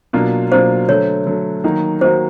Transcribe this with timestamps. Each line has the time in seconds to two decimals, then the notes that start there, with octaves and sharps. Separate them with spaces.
0.13 B2 F#3 A#3 D4 F4
0.51 B2 F#3 A#3 D4 F4 C5
0.88 D3 F#3 A3 C#5
1.26 D3 F#3 A3
1.64 D#3 F#3 A#3 D#4 F#4
2.01 D#3 F#3 A#3 D#4 F#4 C5